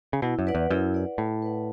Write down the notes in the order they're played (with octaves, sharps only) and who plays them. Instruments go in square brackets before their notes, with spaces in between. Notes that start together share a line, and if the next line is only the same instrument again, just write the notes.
[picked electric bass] C#3
[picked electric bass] B2 [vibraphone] E4
[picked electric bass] F#2
[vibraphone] B4 D5 F#5
[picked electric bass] E2
[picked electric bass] F#2 [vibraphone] E4
[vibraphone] B4 D5 F#5
[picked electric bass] A2 [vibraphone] E4
[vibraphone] B4 D5 F#5